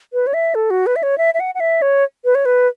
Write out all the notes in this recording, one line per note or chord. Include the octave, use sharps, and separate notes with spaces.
B4
C#5
E5
A4
F#4
B4
E5
C#5
E5
E5
F#5
F#5
E5
C#5
B4
C#5
B4